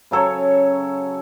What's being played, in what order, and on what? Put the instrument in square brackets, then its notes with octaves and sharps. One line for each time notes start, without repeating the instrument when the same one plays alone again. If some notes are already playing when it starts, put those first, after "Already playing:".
[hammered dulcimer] C#3 F#3 A4 C#5